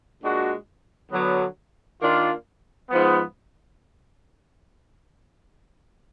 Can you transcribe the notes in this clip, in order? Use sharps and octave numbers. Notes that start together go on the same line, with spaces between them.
A#2 G#3 D4 F#4
D3 F#3 B3
D#3 A#3 D4 F4
G#2 F3 B3